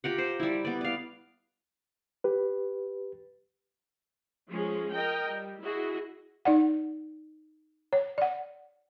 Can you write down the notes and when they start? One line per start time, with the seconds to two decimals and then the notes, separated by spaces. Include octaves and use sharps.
0.04 F4 G4 A#4 F#5
0.18 C5
0.40 G3 E4
0.65 B3 D5
0.81 D5 F5
2.24 G4 B4
4.50 F3 G#3 C#4 G#4
4.94 A#4 D#5 G5
5.29 G3
5.62 E4 F#4 G#4 D#5
6.45 D#4 D5 F#5
7.93 C#5
8.18 D5 F#5